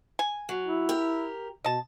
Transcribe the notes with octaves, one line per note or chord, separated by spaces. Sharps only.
G#5
F#3
E4
G4 A#4
B2 D#5 A5